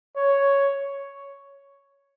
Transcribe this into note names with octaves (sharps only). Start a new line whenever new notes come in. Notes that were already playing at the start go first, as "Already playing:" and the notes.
C#5